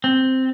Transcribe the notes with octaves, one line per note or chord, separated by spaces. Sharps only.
C4